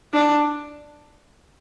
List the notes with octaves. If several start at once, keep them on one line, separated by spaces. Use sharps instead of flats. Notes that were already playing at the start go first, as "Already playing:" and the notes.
D4